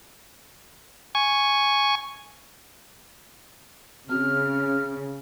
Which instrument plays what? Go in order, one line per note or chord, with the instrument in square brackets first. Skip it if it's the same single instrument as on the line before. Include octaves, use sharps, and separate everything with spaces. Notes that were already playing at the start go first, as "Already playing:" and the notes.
[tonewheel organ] G#5 C#6
[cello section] C#3 [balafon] C4 F#4 [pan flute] F6